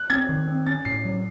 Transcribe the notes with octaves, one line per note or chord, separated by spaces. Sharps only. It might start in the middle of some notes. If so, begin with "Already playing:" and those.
Already playing: F#6
C4 G#6
D#3
C4
C#4 A6
A2 C7
F#3